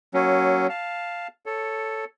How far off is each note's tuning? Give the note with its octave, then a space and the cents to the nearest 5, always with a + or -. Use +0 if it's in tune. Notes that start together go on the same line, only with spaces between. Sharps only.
F#3 +15 A#3 +0 C#4 +0
F5 +0 A5 +0
A4 +0 C#5 +0